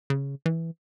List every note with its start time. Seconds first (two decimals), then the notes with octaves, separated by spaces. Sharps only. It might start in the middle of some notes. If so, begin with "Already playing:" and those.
0.10 C#3
0.46 E3